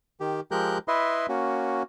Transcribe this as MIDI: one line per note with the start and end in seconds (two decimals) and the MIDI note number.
0.20 0.40 51
0.20 0.40 67
0.51 0.78 53
0.51 0.78 56
0.51 0.78 67
0.51 0.78 70
0.51 0.78 90
0.51 0.78 91
0.88 1.26 64
0.88 1.26 71
0.88 1.26 75
0.88 1.26 76
0.88 1.26 84
1.29 1.83 58
1.29 1.83 61
1.29 1.83 66